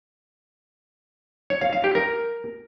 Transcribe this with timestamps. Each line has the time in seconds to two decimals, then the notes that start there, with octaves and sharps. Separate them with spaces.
1.50 C#5
1.61 F5
1.73 F5
1.84 G4
1.95 A#4